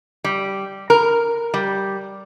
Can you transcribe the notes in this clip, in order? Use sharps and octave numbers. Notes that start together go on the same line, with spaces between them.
G3
A#4
G3